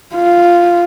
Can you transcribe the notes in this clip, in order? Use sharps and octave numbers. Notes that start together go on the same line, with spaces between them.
F4